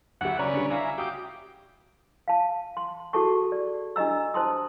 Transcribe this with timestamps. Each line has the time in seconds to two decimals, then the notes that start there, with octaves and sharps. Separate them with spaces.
0.21 D2 F#3 E4 G4 F#5
0.39 C#3 C#4 B4 D5 A#5
0.54 D3 G3
0.70 E4 E5 F5 G#5 A#5
0.98 F#4 G4 F5 D6 D#6 G6
2.28 F5 A5
2.77 C6
3.13 F#4 G#4 A4 A5 C#6
3.52 D5
3.96 D4 G4 D#5 A#5 E6
4.34 C5 A5 C6 D#6